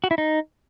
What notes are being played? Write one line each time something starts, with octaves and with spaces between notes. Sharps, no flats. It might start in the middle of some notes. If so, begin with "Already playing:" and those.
F#4
E4
D#4